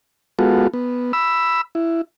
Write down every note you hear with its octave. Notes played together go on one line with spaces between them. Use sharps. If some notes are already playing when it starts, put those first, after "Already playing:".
G#3 B3 F4 F#4 A4
B3
B5 E6
E4